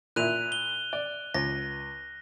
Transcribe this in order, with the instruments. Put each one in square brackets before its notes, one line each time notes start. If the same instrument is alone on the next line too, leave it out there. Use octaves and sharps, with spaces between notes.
[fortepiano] A#2 E4 [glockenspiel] F#6 D#7 F7
[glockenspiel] G7
[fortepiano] D5
[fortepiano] C#2 [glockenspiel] A#6